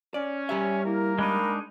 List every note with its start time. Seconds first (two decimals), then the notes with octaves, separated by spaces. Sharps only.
0.14 C#4 D5
0.49 G3 G4 E5
0.85 A#3 E4 A#4
1.18 G#3 D4 D#4 B5